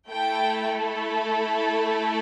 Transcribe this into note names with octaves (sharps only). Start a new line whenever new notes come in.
A3 E4 A4 G5